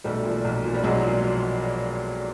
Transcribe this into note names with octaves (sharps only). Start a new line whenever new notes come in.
B1 G3 A3
A#2 F3
B1
A#2 F3
G3
B1 F#3 G#3
A#2 F3